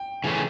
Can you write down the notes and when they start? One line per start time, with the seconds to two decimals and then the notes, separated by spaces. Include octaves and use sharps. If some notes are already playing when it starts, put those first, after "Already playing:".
Already playing: G5
0.24 C#3 E3 A3 C#4